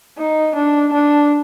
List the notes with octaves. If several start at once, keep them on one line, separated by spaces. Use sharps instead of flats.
D#4
D4
D4